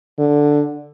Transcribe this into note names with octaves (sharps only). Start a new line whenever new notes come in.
D3